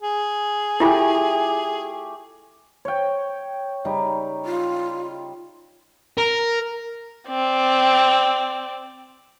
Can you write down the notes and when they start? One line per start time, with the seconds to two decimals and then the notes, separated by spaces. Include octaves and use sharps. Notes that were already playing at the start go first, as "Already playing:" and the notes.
0.02 G#4
0.80 A3 E4 F4 G4 G#5
2.85 C#5 G5
3.85 C#3 G3 D#4
4.45 F4
6.17 A#4
7.29 C4 D5